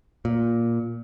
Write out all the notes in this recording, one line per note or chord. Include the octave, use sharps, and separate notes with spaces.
A#2